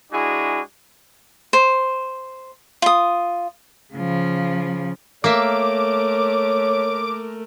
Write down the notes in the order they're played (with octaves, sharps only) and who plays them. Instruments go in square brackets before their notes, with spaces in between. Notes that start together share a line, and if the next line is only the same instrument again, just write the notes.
[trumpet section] G#3 D4 E4 F#4 G#4
[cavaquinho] C5
F4 D#6
[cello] C#3 F3
[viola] A3 A#4 [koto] A#3 E5 [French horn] C#5 [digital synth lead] D6